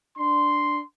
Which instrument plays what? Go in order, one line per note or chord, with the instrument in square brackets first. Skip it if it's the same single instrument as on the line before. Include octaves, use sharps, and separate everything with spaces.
[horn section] D4 C6